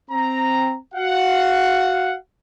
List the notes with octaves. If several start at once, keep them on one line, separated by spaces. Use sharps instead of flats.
C4 A#5
F#4 F5 F#5